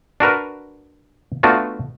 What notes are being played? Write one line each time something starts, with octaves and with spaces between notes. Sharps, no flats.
D4 F#4 A#4 B4
A3 B3 D4 F4 F#4